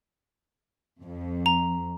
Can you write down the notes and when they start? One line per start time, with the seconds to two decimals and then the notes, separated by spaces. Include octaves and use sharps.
1.02 F2
1.46 A#5